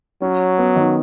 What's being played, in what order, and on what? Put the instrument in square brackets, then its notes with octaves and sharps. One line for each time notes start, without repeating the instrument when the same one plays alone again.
[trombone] F#3 [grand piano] C#4
[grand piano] B3
D#3